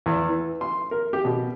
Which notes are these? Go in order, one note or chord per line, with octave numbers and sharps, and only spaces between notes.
E2
E3
C6
A#4
G4
B2